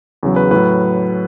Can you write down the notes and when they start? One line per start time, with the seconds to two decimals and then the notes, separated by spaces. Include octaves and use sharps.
0.23 E2 C#3 F#3
0.36 B4
0.51 A2 F#3 B4